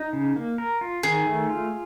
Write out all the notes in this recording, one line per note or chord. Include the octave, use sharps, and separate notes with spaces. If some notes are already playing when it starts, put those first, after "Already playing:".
Already playing: D#4
C#3
A#3
A#4
F4
D#3 G#4
A3
F4